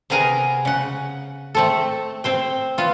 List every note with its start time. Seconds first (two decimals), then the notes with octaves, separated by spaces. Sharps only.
0.10 C3 B3 G#4 A#4 G#5 A#5
0.65 C#3 F#5
1.55 A3 C4 A4
2.24 C4 C5 G5
2.78 B3 F4